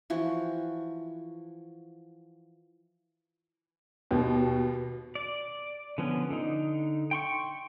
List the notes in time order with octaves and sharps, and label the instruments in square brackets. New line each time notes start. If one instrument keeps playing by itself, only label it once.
[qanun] E3 F3 F#4
[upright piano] D#2 [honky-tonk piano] B2
[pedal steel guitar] D5
D3 F3 B3 C#4
D3 D#4
G5 C6 C#6